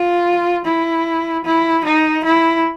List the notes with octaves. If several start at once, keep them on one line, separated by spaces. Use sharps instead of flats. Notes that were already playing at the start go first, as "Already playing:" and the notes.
Already playing: F4
E4
E4
D#4
E4